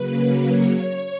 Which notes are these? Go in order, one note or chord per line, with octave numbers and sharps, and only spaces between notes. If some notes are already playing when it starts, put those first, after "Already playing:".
Already playing: C#3 F#3 A#3 B4
C#5